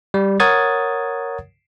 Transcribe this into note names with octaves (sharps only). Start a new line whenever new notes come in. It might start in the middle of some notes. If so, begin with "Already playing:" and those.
G3
A#4 C#5 F#5 D#6 G#6 A6